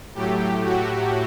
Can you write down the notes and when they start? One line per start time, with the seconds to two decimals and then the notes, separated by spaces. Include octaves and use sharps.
0.14 A2 F#3 A3 G4
0.64 F#4